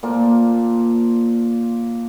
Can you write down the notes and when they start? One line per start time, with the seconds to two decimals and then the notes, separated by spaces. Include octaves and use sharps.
0.03 A#2 A#3 C5 A5